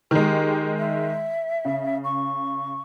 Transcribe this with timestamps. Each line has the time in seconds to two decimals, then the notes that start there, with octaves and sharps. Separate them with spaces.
0.11 D#3 G#3 G4
0.78 E5
1.65 C#3
2.04 C#6